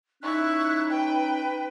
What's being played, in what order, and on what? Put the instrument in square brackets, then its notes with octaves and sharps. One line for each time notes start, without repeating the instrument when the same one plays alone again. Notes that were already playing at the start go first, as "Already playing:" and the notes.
[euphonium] C#4 [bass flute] D#4 [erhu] E4 [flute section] C#6 F#6
[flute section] B4 [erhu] G5